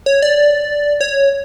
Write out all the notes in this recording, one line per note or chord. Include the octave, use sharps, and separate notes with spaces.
C#5
D5
C#5